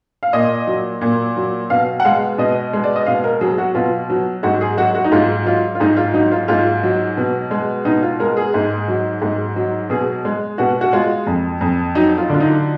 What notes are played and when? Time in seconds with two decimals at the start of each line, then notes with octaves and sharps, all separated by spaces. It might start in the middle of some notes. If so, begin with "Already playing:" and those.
0.23 F5
0.33 A#2 D#5
0.67 F#3
1.01 A#2
1.36 F#3
1.70 B2 F5
2.00 F#5
2.05 G#3 F5
2.38 B2 D#5
2.73 G#3
2.84 D5
2.96 D#5
3.06 B2 F5
3.24 A#4
3.41 F#3 G#4
3.58 F#4
3.75 B2 F4
4.10 F#3
4.43 G#2 F#4
4.61 G#4
4.77 F#3 F#4
4.95 F#4
5.04 D#4
5.12 G#2 F4
5.46 F#3 F4
5.75 F4
5.80 G#2 D#4
5.97 F4
6.14 F#3 D#4
6.32 F4
6.48 G#2 F4
6.83 F#3
7.17 B2
7.51 G#3
7.85 B2 D#4
8.03 F4
8.20 G#3 A#4
8.37 G#4
8.54 G#2
8.88 F#3
9.22 G#2
9.56 F#3
9.90 B2 G#4
10.25 G#3
10.58 B2 F#4
10.81 F#4
10.93 G#3 F4
11.27 F2
11.61 F2
11.95 F#3 D#4
12.18 F4
12.29 D3 F4
12.40 D#4